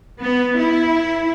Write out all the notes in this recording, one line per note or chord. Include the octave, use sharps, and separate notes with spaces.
B3
E4